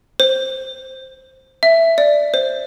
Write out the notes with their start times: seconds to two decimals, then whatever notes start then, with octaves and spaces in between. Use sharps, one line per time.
0.20 C5
1.63 E5
1.98 D5
2.34 C5